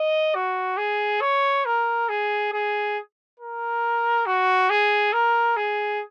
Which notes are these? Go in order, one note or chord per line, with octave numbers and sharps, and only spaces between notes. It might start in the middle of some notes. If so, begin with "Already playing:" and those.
Already playing: D#5
F#4
G#4
C#5
A#4
G#4
G#4
A#4
F#4
G#4
A#4
G#4